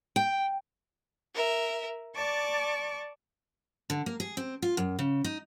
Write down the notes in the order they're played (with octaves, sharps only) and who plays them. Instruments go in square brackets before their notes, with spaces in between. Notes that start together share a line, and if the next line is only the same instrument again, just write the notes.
[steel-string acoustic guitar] G5
[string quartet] A#4 E5
D5 A5 C#6 D6
[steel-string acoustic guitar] D3
A#3
G#4
C4
F4
F#2
C#3
D#4